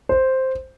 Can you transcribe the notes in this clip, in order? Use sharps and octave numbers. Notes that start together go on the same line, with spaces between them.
C5